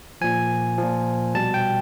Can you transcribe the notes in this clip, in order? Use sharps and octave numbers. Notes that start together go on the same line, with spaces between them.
A#2 F3 G#5
A#2 F3
B2 G3 A5
G5